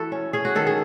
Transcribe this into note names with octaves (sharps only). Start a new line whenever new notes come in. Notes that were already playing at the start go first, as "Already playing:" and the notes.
Already playing: E3 E4 F#4 A4
C#4
C#4 G#4
F#4
D#3 A4
G#4